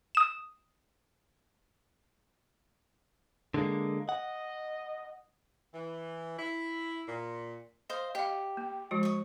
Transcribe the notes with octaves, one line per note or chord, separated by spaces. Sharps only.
D#6 E7
D3 G#3 A#3
D#5 F#5
E3
E4
A#2
C5 D#5 F5
G4 D#5 F5
A#3
F3 G#3 F#4
C#6 D#6